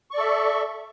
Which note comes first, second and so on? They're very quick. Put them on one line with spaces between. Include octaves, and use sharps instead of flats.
C#6 D5 A4 E5